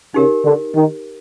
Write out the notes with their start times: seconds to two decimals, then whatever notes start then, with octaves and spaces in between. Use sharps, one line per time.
0.14 C#3 D#4 G4 A#4
0.44 D3
0.76 D#3